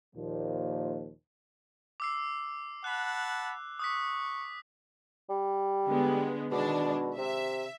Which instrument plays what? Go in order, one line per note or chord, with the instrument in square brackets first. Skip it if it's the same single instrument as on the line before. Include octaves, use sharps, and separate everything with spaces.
[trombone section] D#2 A#2 F3
[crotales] D6 E6 C7
[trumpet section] F#5 A5 B5 [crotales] F#6
[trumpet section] C#6 [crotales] D#6 F#6 B6
[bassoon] G3
[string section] D3 G#3 B3
[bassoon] B2 [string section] D#3 G#3 D4
[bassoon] C3 [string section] E5